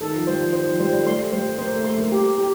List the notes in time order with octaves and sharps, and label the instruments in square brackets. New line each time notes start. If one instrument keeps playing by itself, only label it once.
[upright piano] D#3 [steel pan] A4
[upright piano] F3
[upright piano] G3 [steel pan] C5
[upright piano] F3
[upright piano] D#3 [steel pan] C5
[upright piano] F3
[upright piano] G3 [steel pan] C5
[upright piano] G3
A3
[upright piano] G3 [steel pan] C6
[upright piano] A3
[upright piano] G3 [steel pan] C5
[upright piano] A3
[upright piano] A#3 [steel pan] C5
[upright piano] A3
[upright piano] A3 [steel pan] C6
[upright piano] A#3
[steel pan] G4
G4